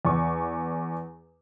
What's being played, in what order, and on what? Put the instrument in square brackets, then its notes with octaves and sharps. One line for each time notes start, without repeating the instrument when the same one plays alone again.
[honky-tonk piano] E2 C#6